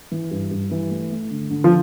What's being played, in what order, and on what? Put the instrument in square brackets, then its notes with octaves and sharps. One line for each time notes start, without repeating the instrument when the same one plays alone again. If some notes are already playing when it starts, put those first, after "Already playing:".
[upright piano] E3
G2
G2
E3
A3
A3
D3
D3
[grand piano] F3